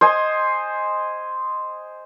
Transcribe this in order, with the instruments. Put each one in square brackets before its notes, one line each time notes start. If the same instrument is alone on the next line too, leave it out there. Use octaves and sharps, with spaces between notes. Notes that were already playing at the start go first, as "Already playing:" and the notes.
[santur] C5 D#5 G#5